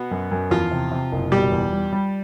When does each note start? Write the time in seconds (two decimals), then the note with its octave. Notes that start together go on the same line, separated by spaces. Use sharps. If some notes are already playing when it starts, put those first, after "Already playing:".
Already playing: B2 B3
0.11 F#2
0.31 F#2
0.51 E2 F3 F4
0.71 C3
0.92 C3
1.12 F#1
1.32 B2 G3 G4
1.52 E2
1.73 G3
1.93 G3